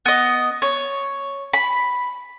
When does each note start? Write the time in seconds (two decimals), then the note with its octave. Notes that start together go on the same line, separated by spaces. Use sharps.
0.06 B3 D#5
0.62 C#5
1.53 B5